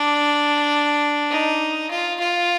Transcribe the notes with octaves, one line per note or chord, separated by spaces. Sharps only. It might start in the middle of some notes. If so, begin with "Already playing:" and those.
Already playing: D4
D#4
F4
F4